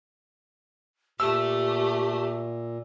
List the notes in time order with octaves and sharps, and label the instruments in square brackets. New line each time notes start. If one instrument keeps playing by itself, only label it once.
[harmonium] A#2 [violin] A3 [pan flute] G4 [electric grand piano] E6